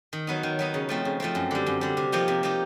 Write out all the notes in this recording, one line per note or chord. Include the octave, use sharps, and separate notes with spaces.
D#3
F#3 B3 D#4
D#3
F#3 B3 D#4
C#3
F3 A3 C4
C#3
F3 A3 C4
F#2
D3 G3
F#2
D3 G3
C3
F3 A#3 D#4 G4
C3
F3 A#3 D#4 G4